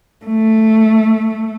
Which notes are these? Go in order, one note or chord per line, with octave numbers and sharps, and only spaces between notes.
A3